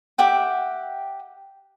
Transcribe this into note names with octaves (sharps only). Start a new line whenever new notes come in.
G4 E5 F#5 G5